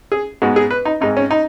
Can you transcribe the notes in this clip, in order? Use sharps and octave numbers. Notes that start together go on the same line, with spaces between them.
G#4
G#2 G#3 B3 F#4
G#4
B4
D#4
G#1 G#2 G#3 D#4
C#4
D#4